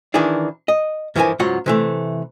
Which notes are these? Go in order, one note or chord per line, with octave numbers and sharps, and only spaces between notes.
D#3 E3 D4 E4 G#4 D5
D#5
G2 E3 F3 E4 A#4 G#5
C#2 G#2 F#3 F4 C#5 F#5
C3 E3 A3